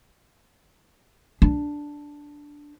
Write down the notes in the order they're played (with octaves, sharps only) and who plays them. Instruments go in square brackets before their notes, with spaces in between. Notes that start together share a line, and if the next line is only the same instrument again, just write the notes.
[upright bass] D4